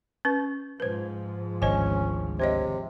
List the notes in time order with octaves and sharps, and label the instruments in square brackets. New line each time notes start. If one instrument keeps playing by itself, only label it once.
[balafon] C#4 B4 C#6
[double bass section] G#2 F3 [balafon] B4 C5
[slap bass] G#1 D2 [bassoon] C#4 [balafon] C5 D#5 G#5
[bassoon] C3 [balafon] C5 C#5 D#5